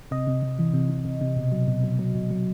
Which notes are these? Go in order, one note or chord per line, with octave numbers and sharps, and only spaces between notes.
C3 D#5
C3
C3
E3
C3
C3
C3
C3
B2
F#3
B2
F#3
F#3
B2
F#3